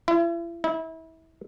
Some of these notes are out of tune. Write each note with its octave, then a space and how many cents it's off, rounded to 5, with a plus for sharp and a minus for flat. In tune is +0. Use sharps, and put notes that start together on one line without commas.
E4 +40
E4 -30